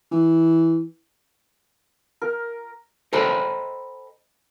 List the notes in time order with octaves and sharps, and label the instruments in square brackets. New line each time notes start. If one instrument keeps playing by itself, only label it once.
[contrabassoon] E3
[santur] A#4
[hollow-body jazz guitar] A4 C5 D#5 G5 A#5 B5